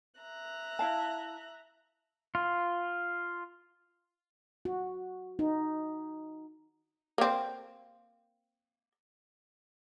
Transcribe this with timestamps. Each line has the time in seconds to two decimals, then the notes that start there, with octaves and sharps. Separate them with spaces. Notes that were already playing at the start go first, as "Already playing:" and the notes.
0.21 E5 A#5 F#6
0.79 E4 F5 A5
2.35 F4
4.65 F#4
5.39 D#4
7.18 A#3 C4